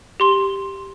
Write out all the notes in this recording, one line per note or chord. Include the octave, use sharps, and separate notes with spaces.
G4 C6 G7